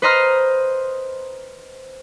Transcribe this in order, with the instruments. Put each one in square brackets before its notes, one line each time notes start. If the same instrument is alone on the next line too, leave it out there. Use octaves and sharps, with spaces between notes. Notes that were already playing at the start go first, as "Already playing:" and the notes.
[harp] B4 C5 D#5 A#5 C6 F6